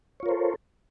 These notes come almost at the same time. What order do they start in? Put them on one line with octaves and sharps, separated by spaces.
C#5 F4 A#4 C5 A4